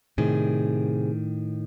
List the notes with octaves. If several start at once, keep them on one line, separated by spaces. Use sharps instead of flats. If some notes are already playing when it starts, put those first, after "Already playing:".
A2 C3 D#3 G#4